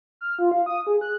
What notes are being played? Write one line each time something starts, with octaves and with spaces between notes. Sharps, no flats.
F6
F4
F5
D#6
G#4
F#6